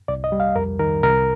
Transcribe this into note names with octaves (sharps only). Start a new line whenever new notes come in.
C2 D5
D#5
G3
F5
F2 A#4
D#3 A#4
C2 A#4